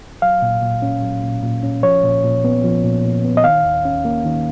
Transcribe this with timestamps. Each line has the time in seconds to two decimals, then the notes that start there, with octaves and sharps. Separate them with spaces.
0.22 F#3 F5
0.42 A#2
0.62 A#2
0.82 C#4
1.02 F#3
1.23 A#2
1.43 A#2
1.63 C#4
1.83 F3 C#5
2.03 A#2
2.24 A#2
2.44 B3
2.64 F3
2.84 A#2
3.04 A#2
3.24 B3
3.37 D#5
3.44 D#3 F5
3.65 D#2
3.85 C#4
4.05 A#3
4.25 D#3